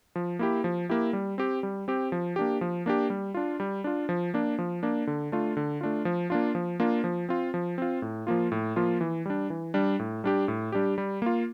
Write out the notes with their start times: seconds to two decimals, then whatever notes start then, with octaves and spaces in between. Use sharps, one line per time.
0.16 F3
0.39 A#3 E4 G4
0.64 F3
0.89 A#3 E4 G4
1.13 G3
1.38 C4 G4
1.63 G3
1.88 C4 G4
2.12 F3
2.36 A#3 D4 G4
2.61 F3
2.86 A#3 D4 G4
3.10 G3
3.34 D4 F4
3.60 G3
3.84 D4 F4
4.09 F3
4.34 A#3 D4
4.58 F3
4.83 A#3 D4
5.07 D3
5.32 A3 D4 F4
5.57 D3
5.81 A3 D4 F4
6.05 F3
6.30 A#3 D4 F4
6.55 F3
6.80 A#3 D4 F4
7.04 F3
7.29 C4 F4
7.54 F3
7.78 C4 F4
8.02 A2
8.27 F3 A#3 F4
8.52 A2
8.76 F3 A#3 F4
9.01 E3
9.26 G3 D4
9.50 E3
9.74 G3 D4
9.99 A2
10.24 G3 D4 G4
10.48 A2
10.72 G3 D4 G4
10.98 G3
11.22 A#3 F4